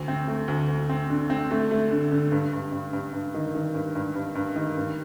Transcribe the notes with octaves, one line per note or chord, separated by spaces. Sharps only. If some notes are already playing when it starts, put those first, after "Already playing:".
Already playing: D2
C4
A3
D2
D2
C4
D3
C4
A3
A3
D3
D3
G2
G2
G2
G2
G2
D#3
D#3
G2
G2
G2
G2
D#3
G2